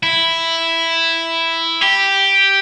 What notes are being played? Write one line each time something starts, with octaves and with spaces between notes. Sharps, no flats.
E4
G4